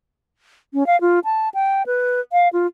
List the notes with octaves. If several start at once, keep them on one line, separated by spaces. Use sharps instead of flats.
C#4
F5
F4
A5
G5
B4
F5
F4